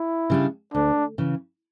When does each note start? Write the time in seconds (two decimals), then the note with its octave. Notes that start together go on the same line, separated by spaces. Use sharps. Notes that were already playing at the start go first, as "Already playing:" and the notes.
Already playing: E4
0.30 C#3 G3 D4
0.74 D2 D4
1.18 C#3 E3